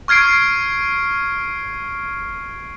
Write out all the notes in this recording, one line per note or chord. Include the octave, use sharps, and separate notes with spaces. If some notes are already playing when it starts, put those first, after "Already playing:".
C#6 F6 G#6 C7 D7